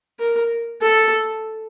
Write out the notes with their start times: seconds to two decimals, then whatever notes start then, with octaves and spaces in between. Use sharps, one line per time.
0.19 A#4
0.82 A4